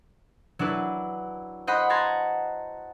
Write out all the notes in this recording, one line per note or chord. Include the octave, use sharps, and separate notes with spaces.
F#3 D4 E4 B4
C5 D#5 F#5 B5
F#5 A5 A#5 C6 G#6